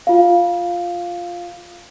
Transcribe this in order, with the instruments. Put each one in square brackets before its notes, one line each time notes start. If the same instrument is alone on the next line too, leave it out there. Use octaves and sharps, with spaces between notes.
[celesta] F4 F5